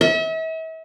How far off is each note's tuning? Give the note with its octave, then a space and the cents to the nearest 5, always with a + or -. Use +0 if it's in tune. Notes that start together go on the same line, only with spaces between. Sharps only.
E5 -40